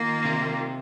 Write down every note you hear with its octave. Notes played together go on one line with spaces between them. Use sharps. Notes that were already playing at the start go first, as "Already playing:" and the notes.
Already playing: D#3 A#3 F4
C3